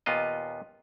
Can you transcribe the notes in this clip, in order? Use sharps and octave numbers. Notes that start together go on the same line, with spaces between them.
D#2 A#2 B3 F4 D#5